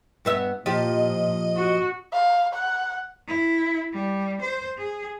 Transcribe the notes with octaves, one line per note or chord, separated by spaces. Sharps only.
G2 B3 E5
A#2 F3 G4 D#5
F#4
F5
F#5
E4
G3
C5
G#4